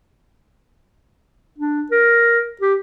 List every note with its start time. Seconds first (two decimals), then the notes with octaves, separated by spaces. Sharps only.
1.58 D4
1.91 A#4
2.61 G4